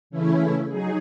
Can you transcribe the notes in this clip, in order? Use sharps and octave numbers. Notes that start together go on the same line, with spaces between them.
C#3 E3 A3 C#4 E4
F#3 D#4 G#4